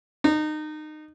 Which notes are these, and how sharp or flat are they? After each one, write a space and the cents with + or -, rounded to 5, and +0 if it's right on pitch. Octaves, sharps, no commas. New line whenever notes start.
D#4 -25